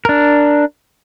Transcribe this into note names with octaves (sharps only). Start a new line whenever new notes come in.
D4 A#4